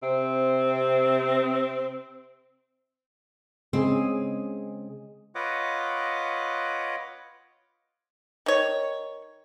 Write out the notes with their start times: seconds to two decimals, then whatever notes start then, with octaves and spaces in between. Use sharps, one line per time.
0.03 C3 C4
3.73 C#3 G#3 C4 G#4
5.35 F4 B4 C#5 D#5 F#5 D6
8.46 D#3 C#5